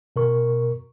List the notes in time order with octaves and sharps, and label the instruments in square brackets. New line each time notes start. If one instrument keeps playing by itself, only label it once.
[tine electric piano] B2 A#4 C#6